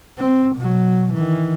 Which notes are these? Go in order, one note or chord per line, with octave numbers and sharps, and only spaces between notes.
C4
B2 F#3
D#3 E3